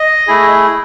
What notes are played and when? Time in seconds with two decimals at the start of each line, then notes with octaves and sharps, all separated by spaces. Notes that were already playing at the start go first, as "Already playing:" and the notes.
Already playing: D#5
0.27 A3 E4 G#4